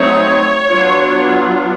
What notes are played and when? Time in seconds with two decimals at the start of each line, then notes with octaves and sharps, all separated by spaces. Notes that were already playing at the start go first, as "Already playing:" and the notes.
Already playing: F#3 A3 C4 D#4 C#5
0.69 F#3 B3 D4 F4